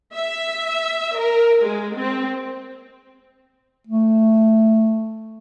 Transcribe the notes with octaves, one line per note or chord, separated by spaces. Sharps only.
E5
A#4
G#3
C4
A3